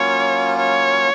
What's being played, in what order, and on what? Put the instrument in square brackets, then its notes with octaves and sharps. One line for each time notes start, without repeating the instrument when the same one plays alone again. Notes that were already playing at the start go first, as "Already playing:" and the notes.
Already playing: [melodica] F#3 A#3 C#4 F4 [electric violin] C#5
[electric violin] C#5